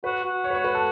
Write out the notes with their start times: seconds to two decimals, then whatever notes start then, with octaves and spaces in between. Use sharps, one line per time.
0.04 F#4 B4
0.24 F#4
0.44 C#5
0.50 B4
0.55 C#5
0.64 B4
0.75 A4